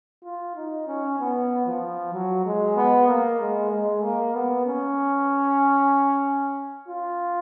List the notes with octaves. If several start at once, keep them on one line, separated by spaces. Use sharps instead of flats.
F4
D#4
C#4
B3
F3
F#3
G#3
B3
A#3
G#3
G#3
A#3
B3
C#4
F4